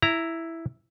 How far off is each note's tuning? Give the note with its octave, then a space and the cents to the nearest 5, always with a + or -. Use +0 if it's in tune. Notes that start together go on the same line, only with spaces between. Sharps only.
E4 +0 A#5 +0